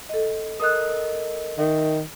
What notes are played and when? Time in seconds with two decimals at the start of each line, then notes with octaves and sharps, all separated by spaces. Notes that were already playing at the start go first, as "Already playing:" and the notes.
0.09 A4 D#5
0.60 A4 A#4 D#5 D#6 F#6
1.59 D#3 E5